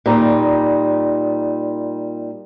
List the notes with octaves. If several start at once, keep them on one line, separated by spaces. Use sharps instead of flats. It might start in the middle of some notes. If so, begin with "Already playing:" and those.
A#2 G3 D#4